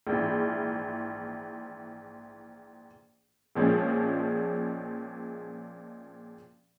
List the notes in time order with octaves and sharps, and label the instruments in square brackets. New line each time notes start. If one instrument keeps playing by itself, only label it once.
[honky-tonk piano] A#1 G#2 E3
A#1 A#2 F3 G#3 C#4